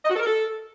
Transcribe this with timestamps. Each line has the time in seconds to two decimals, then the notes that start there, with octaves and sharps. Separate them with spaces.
0.04 D#5
0.09 F#4
0.14 A4
0.19 A#4
0.24 A4